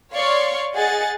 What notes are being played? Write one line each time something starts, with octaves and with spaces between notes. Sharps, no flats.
C#5 D5 F5 C6 C#6
G#4 D#5 F#5 A6